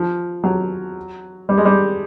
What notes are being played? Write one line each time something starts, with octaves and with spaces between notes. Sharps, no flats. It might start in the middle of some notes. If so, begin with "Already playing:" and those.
Already playing: F3
F#3
G3
G#3
G3